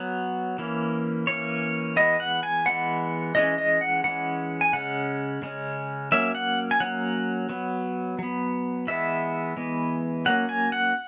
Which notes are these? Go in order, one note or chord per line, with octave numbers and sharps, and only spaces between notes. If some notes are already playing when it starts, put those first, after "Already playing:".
Already playing: F#3 B3 F#4
E3 A#3 C#4
E3 A#3 C#4 C#5
E3 G#3 B3 D#5
F#5
G#5
E3 G#3 B3 F#5
E3 G#3 C#4 D#5
D#5
F#5
E3 G#3 C#4 F#5
G#5
C#3 G#3 C#4 F#5
C#3 G#3 C#4
F#3 A#3 C#4 E5
F#5
G#5
F#3 A#3 C#4 F#5
F#3 B3
F#3 B3
E3 G#3 B3 E5
E3 G#3 B3
F#3 A#3 C#4 F#5
G#5
F#5